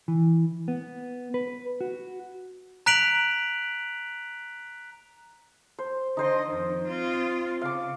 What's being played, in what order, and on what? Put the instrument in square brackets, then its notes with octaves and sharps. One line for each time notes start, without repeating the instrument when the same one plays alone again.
[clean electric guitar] E3
B3
B4
F#4
[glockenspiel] A#5 F#6 B6 D7 F7 F#7
[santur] C5
[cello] D3 D#5 [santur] D#4 C5 C6
[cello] F2 D#3
C4 F4
[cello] C#3 [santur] F5 D6